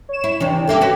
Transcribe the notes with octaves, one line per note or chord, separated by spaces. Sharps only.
C#5 E7
E4
D#2 C3 E3 C#4 D4
G2 A#3 G4 A4 E5
C#4 F#4 B4